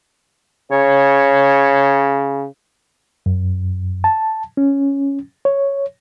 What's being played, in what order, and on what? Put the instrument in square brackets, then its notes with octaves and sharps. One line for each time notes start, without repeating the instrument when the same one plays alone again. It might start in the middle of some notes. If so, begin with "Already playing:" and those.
[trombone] C#3 [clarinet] C#5
[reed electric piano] F#2
A5
C#4
C#5